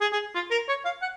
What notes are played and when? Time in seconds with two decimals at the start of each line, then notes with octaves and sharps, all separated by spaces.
0.01 G#4
0.13 G#4
0.35 F4
0.51 A#4
0.68 C#5
0.85 F5
1.02 F#5